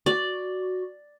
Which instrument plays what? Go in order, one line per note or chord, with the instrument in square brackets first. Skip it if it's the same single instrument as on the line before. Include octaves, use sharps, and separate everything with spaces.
[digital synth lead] F#4 [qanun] D5